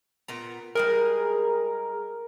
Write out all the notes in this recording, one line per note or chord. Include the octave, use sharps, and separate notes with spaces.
A#2 B3 A#5
G3 G#3 G#4 A#4